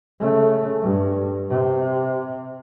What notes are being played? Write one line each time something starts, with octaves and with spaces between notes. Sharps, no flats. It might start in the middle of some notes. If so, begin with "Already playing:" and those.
C#3 A3
G2
C3